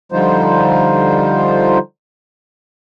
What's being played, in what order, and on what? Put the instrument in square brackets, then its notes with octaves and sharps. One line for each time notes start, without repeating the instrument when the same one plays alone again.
[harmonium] D3 F3 G3 D#4 F4 C5